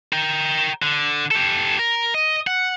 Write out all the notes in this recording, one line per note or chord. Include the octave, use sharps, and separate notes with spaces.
A#4 G5
D3
G4 A4
A#4
D#5
F#5